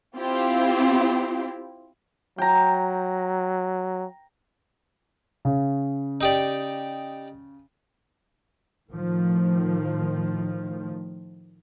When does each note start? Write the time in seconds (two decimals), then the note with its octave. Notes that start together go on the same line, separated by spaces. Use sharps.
0.16 C4 E4 F4 G4
2.38 F#3 G5 A#5
5.45 C#3
6.21 D#4 G4 D5
8.91 A2 D#3 F3